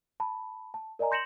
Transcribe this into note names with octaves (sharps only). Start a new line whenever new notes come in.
A5 B5
A5
A#4 D5 D#5 G#5 A#5
C6 G6 A#6 C#7 E7 F#7